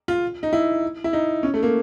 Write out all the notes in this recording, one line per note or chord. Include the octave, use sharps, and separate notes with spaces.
F4
D#4
E4
E4
D#4
C#4
A3
A#3